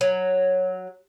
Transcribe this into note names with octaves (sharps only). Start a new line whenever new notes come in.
F#3